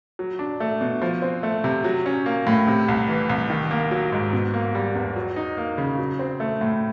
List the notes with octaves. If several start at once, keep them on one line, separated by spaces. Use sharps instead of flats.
F#3
D4
A3
B2
F3
C4
A3
C3
F#3
C#4
A#3
A2
C3
C2
E3
C2
D#3
A#3
F#3
G#2
B2
A#3
G3
E2
F#3
D#4
A#3
C#3
F#3
C4
A3
A2